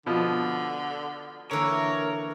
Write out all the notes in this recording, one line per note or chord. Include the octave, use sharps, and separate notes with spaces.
B2 D3 F3
D3 E3 A#3 A#4 C#5